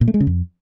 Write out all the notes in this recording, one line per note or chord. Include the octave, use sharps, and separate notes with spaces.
A#2
A3
G#3
C#3
F2